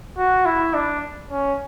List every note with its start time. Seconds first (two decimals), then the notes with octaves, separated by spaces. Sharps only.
0.17 F#4
0.45 E4
0.74 D4
1.31 C#4